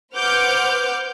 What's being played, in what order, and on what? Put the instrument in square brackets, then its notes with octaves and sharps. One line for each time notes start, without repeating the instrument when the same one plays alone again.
[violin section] B4 C5 F#5 D6 F6 G6